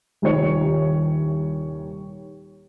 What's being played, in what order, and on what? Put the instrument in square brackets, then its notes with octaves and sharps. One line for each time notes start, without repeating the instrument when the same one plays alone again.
[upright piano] D#1 C2 D#3 C#5 C#7